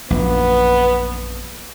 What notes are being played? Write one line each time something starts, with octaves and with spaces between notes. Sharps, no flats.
A#1 F#2 B3